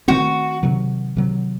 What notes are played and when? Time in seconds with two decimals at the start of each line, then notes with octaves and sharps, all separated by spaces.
0.08 D#3 F#3 A3 C4 F#4
0.63 C3 D#3 F#3
1.16 C3 D#3 F#3